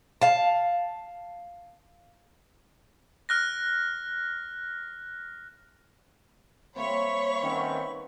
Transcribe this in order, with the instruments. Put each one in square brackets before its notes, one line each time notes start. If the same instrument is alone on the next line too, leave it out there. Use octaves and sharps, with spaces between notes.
[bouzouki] F5 A5
[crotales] F6 F#6 A#6
[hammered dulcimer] G3 A#3 C4 [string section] C#5 [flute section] E5 B5 C#6
[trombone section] D#3 C4 C#4 [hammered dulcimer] B4 F#5 A#5